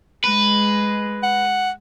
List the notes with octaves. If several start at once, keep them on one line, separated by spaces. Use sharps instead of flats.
G#3 B4
F#5